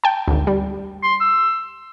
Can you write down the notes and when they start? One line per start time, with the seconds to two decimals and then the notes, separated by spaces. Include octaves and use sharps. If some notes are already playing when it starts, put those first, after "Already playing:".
0.04 G5 A5
0.28 G#1 D2
0.47 G3
1.03 C6
1.21 E6